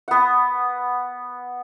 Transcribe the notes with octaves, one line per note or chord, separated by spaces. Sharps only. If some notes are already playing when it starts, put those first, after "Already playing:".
B3 F#5